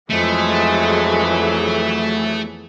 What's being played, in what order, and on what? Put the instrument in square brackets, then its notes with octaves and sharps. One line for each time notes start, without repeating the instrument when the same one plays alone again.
[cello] F2 [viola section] E3 F#3 G#4 [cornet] G#3 [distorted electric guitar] A3